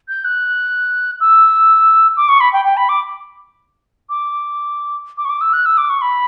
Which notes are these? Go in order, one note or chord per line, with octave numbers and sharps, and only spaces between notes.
G6
F#6
E6
D6
C#6
B5
G5
G5
B5
D6
D6
D6
C#6
D6
E6
F#6
E6
D6
C#6
B5